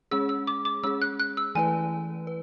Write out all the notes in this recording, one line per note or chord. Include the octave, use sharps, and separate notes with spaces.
G#3 C#4 G#4 E6
E6
D6
D6
G#3 C#4 G#4 E6
F#6
F#6
E6
E3 A3 E4 B4 G#5
B4